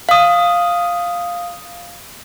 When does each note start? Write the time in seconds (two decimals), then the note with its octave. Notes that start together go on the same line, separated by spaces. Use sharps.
0.09 F5 D#6